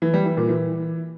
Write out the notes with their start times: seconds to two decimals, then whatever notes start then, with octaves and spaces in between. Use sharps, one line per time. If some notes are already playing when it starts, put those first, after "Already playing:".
0.02 E3
0.14 G3
0.25 E3
0.37 A#2
0.49 E3